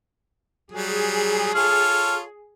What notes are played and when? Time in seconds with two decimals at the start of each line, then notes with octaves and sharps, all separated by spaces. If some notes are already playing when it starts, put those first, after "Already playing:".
0.72 F#3 G3 G#4
1.54 F4 A4 C#5 F6